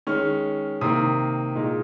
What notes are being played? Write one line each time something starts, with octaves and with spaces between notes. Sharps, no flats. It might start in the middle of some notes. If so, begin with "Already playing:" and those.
D#3 G#3 C#4 C#6 F6
C3 D#3 A#3 C6 D#6
A#2 G#3 D#4